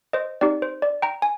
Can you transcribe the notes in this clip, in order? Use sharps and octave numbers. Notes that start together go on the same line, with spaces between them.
C5 D#5
C4 D#4 G4 D5
C5
D5
G5 A#5
G#5